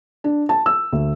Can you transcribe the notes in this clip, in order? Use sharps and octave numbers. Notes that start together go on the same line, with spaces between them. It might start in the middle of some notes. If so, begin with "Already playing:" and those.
D4
A5
E6
D2